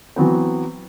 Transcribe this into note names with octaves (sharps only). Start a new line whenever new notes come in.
E3 F#3 B3 C4